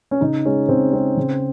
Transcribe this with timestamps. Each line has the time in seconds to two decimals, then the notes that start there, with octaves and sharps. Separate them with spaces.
0.11 C#4
0.21 C#3 D#4
0.45 G#3 C#4
0.69 C#3 C4
0.93 G#3 C4
1.17 C#3